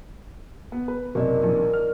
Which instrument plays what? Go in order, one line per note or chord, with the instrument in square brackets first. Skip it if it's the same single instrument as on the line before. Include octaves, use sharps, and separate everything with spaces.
[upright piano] B3
B4
[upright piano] F#1 C3 [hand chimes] A#4 D5 D#5
[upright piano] A#1 D#3
F6